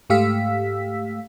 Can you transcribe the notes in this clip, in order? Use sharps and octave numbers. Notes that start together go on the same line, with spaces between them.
G#2 A3 G4 F5 E6 B6